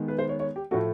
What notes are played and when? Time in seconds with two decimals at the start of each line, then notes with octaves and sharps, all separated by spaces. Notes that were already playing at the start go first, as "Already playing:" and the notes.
Already playing: D#3 G#3 B3
0.08 B4
0.18 C5
0.29 C#5
0.40 C#5
0.56 G4
0.71 A2 F3 A3 F#4